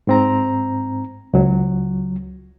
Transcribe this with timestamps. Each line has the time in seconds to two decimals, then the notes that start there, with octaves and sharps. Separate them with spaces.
0.07 G#2 C4 A#5
1.34 C#2 F#3